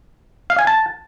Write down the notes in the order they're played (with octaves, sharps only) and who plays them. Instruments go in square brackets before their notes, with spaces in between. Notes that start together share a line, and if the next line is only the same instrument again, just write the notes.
[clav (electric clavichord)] F5
G#5
A5